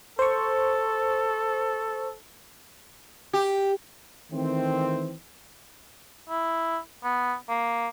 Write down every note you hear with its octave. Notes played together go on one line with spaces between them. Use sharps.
A4 C5 C#6
G4
D#3 E3 A3 C4
E4
B3
A#3